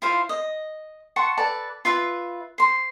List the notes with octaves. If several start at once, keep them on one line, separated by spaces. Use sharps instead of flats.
E4 F4 C5 F5
D#5
F#5 A5 C6 C#6
A4 B4 D5 A5
F4 B4 E5
C5 C6